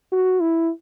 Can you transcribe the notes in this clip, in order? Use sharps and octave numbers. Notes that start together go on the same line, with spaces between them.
F#4
E4